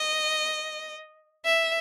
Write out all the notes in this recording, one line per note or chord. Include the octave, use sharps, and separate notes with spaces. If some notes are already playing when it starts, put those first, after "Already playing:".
Already playing: D#5
E5